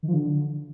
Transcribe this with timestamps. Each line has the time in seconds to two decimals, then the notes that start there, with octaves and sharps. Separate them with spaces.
0.03 D#3
0.08 F3
0.14 D3